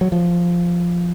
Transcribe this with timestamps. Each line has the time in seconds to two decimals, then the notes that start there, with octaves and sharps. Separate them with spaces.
0.01 F#3
0.12 F3